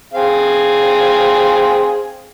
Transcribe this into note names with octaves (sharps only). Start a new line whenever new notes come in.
C4 G#4 F5